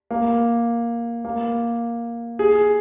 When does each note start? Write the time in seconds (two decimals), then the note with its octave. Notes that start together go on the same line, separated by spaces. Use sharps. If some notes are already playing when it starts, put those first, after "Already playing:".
0.11 A#3
1.25 A#3
2.39 G#4